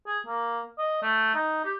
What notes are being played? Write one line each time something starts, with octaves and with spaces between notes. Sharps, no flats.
G#4
A#3
D#5
A3
D#4
G4